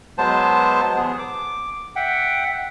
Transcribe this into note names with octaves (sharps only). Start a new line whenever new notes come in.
F#3 G#3 B3 C5 A5
E2 B3 G#4
D6
E5 F#5 G5